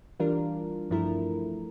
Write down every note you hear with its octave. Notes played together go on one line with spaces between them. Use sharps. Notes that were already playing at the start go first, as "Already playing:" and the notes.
E3 G3 D4 F4 A#4
G2 F3 A3 E4 A#4